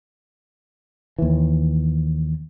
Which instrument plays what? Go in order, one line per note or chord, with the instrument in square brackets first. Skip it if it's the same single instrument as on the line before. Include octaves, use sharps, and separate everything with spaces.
[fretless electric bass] D#2 E3